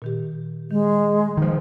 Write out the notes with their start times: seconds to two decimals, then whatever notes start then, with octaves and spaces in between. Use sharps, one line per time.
0.02 A#2 D#3 G4
0.70 D#3 G#3
1.37 D#3 F3